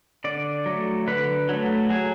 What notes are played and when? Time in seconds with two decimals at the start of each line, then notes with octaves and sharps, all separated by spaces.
0.24 D3 D5
0.66 F#3 A3
1.07 D3 B4
1.49 F#3 A3
1.90 F#3 G#4